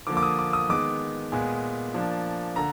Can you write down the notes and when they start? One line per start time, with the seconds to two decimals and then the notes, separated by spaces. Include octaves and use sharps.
0.07 D3 F3 A#3 D6
0.17 D6
0.23 D#6
0.39 D6
0.53 D#6
0.69 D#3 G#3 B3 D6
1.32 A#2 G#3 B3 G#5
1.94 F3 A#3 D4
2.56 D3 A#5